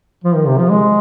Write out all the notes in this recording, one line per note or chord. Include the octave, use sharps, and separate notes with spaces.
F3
D#3
C3
F3
G#3